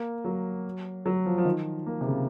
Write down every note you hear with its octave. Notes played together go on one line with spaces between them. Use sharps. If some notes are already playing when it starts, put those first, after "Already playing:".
Already playing: A#3
F#3
F#3
F3
F3
D#3
A#3
C3
C#3